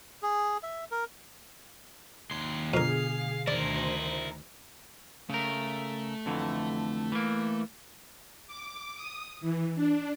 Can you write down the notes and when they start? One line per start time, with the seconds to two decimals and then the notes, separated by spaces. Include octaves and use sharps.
0.23 G#4
0.63 E5
0.91 A#4
2.31 D#2 C6
2.74 F2 B2 D3 G#4 A#4 F5
3.48 D2 D#3 E4 A#4 C5 D5
5.30 C#3 A3 A#4
6.26 F2 D3 E3
7.12 E3 A#3
8.47 D6
8.96 D#6
9.41 E3
9.76 D4